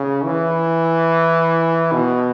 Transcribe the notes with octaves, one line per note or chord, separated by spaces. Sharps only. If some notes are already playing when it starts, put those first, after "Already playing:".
Already playing: C#3
E3
B2